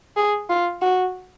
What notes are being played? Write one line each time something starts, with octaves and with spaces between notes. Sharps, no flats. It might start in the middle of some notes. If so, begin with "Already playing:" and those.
G#4
F4
F#4